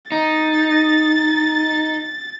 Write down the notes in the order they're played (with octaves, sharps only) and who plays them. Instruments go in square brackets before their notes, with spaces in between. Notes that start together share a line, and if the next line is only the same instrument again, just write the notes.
[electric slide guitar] D#4 [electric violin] A6